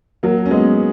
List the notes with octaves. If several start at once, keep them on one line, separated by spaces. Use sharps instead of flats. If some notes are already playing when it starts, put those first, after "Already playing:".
F#3 A#3
C#4
G#3 B3